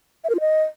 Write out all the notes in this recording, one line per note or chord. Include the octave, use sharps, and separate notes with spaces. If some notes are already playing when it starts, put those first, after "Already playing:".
E5
A#4
F4
D#5